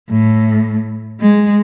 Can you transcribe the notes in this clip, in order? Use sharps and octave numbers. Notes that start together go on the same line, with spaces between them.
A2
G#3